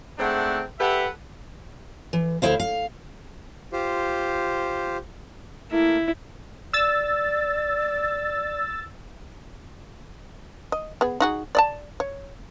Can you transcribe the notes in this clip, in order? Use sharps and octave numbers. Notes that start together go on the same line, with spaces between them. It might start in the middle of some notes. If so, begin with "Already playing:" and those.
G#2 A3 C4 D4 F#5
G4 A4 B4 E5 F#5
E3
D2 E4 C5 F5
F5
F4 G4 C5
A3 A#3 E4
D5 E6 A6
D#5
B3 G#4
D#4 F#4 G#4
D5 D#5 A5
C#5